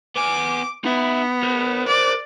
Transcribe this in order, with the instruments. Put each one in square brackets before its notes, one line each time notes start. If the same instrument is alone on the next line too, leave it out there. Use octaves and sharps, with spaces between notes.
[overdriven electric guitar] B3 G#5 [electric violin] D6
[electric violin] B3 [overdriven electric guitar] D#4 E5
[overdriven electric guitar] A#4 C5
[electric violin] D5